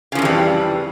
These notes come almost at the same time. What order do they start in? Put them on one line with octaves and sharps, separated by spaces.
C#3 F3 F2 E3 G3